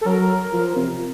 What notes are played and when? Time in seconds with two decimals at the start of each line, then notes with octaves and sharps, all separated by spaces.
0.01 A4
0.06 F#3 A#4
0.53 F3
0.76 C3